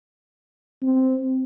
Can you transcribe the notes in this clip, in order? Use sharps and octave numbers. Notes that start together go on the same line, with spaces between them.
C4